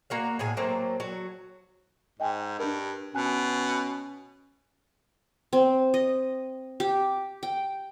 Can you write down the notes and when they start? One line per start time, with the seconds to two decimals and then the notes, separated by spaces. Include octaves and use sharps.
0.10 A#3 F#4 F5
0.39 A2 G#4 G#5
0.57 F#3 A3 A#3 C4
1.00 F#3 F#4
2.20 G#2 D#5 G5 G#5
2.59 G2 D4 A#4
3.15 B2 C#4 G#5 A5 F#6
5.53 C4
5.94 D#5
6.80 G4
7.43 G5